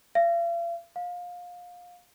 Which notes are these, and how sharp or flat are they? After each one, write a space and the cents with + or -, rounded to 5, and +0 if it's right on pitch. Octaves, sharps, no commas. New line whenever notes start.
F5 -45
F5 +25